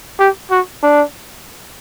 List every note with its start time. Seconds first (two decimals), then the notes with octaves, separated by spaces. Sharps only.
0.19 G4
0.51 F#4
0.83 D4